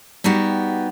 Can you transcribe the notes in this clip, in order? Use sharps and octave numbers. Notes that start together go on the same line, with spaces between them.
G3 B3 D#4 F#4 G4